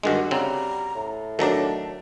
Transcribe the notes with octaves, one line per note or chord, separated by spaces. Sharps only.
G2 D3 D#3 G#3 F#4
C#3 G3 C4 A#5
A2
D#3 F#3 A3 D4 A5 A#5